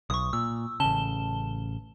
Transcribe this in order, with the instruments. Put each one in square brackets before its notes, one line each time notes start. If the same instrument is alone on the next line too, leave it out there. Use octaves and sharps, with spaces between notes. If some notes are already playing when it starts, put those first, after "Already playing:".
[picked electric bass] B1 [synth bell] C#6 D#6
[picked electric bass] A#2 [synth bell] E6
[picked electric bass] A1 C#3 [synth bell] A5 E7 G7